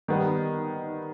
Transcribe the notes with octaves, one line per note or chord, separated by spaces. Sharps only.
D#3 G3 B3